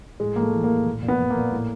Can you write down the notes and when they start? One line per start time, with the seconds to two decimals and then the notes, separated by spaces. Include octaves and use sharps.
0.20 A2 G#3
0.36 A2 A#3
0.43 A3
0.54 E3
0.64 A#3
0.70 A2
0.86 A#2
1.02 A#2
1.08 B3
1.20 A#2
1.31 A#3
1.36 A#2
1.52 A2